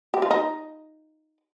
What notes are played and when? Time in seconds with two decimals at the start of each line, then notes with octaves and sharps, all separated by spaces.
0.14 G4
0.22 F4
0.31 D#4